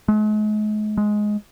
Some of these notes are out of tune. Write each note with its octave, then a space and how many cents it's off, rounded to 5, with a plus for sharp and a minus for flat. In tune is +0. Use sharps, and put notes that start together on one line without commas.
G#3 +40
G#3 +10